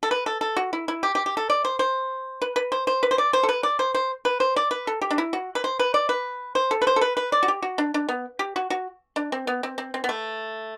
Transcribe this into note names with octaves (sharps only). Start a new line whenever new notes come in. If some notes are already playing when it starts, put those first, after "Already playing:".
A4
B4
A4
A4
F#4
E4
E4
G4
G4
G4
A4
D5
C5
C5
B4
B4
C5
C5
B4
C5
D5
C5
A4
B4
D5
C5
C5
B4
C5
D5
B4
A4
G4
D4
E4
F#4
B4
C5
B4
D5
B4
C5
A4
B4
C5
A4
B4
B4
D5
F#4
G4
F#4
D4
D4
B3
G4
F#4
F#4
D4
C4
B3
C4
C4
C4
B3
A3